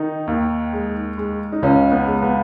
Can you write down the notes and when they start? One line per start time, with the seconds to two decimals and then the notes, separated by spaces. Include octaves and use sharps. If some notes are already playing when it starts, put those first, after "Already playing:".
Already playing: D#3 D#4
0.27 D#2
0.73 G#3
1.18 G#3
1.52 D#4
1.62 C#2 C#4
1.92 B3
2.07 G#3
2.22 B3